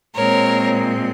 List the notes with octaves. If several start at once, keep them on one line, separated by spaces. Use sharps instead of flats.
A#2 G#3 C4 A#4 C#5